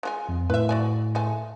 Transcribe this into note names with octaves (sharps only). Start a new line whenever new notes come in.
G#3 F4 G#5
F2
A2 B4 E5
F#4 D5 G#5
G#3 A3 G#5